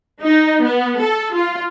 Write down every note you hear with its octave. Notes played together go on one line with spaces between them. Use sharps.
D#4
B3
A4
F4